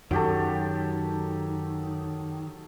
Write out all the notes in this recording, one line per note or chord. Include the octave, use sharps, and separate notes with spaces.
F#2 D#3 F#3 G4 A4